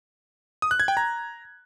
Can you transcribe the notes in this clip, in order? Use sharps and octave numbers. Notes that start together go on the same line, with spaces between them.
D#6
F#6
G#6
G5
A#5